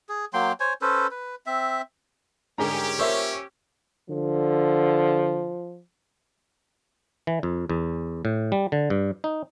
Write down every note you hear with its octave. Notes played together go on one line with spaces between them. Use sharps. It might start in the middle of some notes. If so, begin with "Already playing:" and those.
G#4
F#3 A#3 G5 C6
C5 C#5 G#5
C#4 A4 B4 C5
B4
C4 E5
G#2 D3 C#4 G4 G#4 A#4 A#5
A#3 F4 A#4 C5 C#5 E5 C#6 E6
D3 F3
E3
F2
E2
A2
G3
D3
G2
D#4